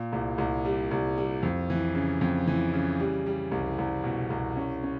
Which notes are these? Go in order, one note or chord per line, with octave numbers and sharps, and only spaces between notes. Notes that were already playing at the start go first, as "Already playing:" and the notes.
Already playing: A#2
C2
C2
G3
C2
G3
F2
E3
C#3
F2
E3
C#3
G3
G3
C2
C2
B2
C2
C#4
C#4